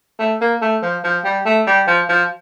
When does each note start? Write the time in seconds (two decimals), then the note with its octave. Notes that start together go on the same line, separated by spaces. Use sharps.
0.19 A3
0.41 A#3
0.62 A3
0.83 F3
1.04 F3
1.24 G3
1.46 A3
1.67 G3
1.87 F3
2.09 F3